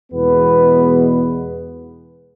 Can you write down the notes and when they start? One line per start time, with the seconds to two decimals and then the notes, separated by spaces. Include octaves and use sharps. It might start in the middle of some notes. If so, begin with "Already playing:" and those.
0.13 E2 B2 G#3 B3 B4